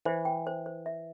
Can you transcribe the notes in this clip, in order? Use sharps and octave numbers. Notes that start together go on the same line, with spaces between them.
E3 C5
G5
C5
C5
E5